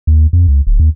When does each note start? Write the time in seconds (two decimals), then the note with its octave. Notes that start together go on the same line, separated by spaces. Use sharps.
0.07 D#2
0.33 F2
0.48 C#2
0.67 D1
0.80 D#2